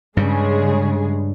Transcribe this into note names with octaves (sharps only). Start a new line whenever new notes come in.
G2 C#3 G3 G#3 G#4